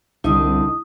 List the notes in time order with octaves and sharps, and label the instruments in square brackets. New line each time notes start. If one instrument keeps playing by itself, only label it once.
[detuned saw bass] C2 [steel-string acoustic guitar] D3 D#4 [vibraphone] E4 D#6